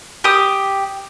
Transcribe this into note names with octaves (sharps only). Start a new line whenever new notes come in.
G4 D#6